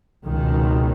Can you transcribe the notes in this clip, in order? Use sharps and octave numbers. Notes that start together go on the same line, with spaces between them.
C#2 B2 D#3